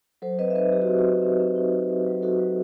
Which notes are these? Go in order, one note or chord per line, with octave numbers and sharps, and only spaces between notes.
F#3 A4 C5
C4 B4 D#5
E5
D#4 B4 D#5
F#3 G4
F#4
C4
F#4
F#3
C4
C4
D#4
D#4
F#3
F#3
D#4 F#4 A4
F#3